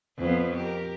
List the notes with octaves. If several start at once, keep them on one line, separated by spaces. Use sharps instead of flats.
F2 F3 B3
G4 A#4